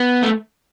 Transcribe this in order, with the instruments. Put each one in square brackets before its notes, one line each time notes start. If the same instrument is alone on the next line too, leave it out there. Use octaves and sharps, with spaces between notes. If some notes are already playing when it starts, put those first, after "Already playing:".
Already playing: [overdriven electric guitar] B3
A3